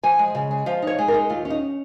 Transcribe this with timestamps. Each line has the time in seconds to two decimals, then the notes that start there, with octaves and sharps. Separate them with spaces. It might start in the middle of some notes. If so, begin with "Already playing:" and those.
0.03 F3 G#5
0.19 G#3
0.35 C#3
0.51 G#3
0.66 F3 F5
0.82 D#4 C#5
0.99 G#3
1.08 A#4
1.14 D#4
1.29 D#2 F4
1.45 C#4
1.50 D#4